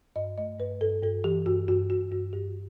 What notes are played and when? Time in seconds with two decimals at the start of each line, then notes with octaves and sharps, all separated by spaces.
0.16 G2 D#5
0.38 A3 D#5
0.59 G2 B4
0.81 G2 A4
1.02 G2 A4
1.24 E3 G4
1.46 G2 F#4
1.68 G2 F#4
1.90 G2 F#4
2.12 G2 F#4
2.33 G2 G4